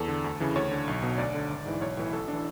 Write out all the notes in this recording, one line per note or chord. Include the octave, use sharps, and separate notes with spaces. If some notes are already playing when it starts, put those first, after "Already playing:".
Already playing: E2 A4
D3
D2
C#3 E3
D2 C#5
D3
B1
B2
D2 D5
D3
G#1
G#2 E3
B1 C#5
A2 E3
A1 A4
D4
E3